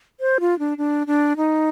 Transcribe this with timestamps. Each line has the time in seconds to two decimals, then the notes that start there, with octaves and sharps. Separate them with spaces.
0.20 C5
0.40 F4
0.59 D4
0.78 D4
1.07 D4
1.37 D#4